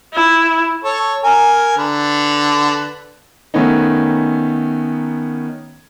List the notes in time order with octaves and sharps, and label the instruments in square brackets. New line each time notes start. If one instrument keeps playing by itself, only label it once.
[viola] E4
[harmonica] A4 C#5
A#4 G#5
D3 B4
[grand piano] D#3 A3 B3 C#4 D#4